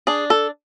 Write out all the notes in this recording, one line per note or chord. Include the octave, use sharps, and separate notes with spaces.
D4 G#4
A4